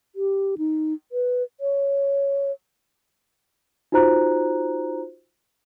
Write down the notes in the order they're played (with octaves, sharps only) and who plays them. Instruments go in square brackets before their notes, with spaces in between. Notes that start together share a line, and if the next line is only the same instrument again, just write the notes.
[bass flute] G4
D#4
B4
C#5
[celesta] D#4 F4 F#4 C5 A#5 F#6